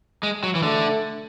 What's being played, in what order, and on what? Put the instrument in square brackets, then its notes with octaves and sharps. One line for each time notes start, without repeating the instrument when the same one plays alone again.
[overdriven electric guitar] G#3
F#3
E3
[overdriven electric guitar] D3 [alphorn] A3